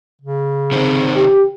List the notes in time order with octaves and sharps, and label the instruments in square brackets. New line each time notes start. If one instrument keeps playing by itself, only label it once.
[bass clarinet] C#3
[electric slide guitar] C3 D#3 C4
[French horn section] G4